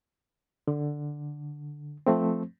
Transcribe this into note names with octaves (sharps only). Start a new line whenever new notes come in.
D3
F3 A3 C4